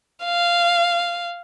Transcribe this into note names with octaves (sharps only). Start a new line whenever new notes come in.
F5